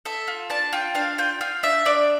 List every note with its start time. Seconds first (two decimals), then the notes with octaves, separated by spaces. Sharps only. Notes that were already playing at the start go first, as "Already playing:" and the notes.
0.05 A4 E5
0.28 F4
0.50 D4 A5
0.73 F4 G5
0.95 D4 F5
1.18 F4 G5
1.41 F4 F5
1.63 D4 E5
1.85 D4 D5